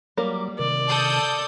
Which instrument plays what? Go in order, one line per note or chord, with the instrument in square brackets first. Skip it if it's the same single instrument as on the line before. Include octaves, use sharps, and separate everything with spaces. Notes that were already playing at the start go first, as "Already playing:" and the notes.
[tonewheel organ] F#3 D6 [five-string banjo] G3 A#3 A#4
[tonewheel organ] C3 D#3 [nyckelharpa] D5
[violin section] A4 D#6 G6